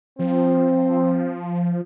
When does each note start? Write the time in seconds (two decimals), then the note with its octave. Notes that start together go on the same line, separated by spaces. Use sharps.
0.19 F3 C4